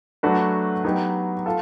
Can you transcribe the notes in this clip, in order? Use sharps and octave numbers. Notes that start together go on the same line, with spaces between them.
F#3 A3 D4 F#4 B4
F#3 B3 D#4 G4
F4 A4